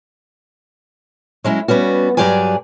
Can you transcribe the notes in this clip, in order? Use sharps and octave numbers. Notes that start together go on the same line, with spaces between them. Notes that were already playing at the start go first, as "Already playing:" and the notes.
F#3 G#3 C#4 E4
G3 B3 C#4 F#4
G2 F#3 G4 G#4 D5 G#5